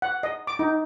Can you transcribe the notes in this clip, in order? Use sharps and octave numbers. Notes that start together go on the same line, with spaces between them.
F#5
D#5
D6
D#4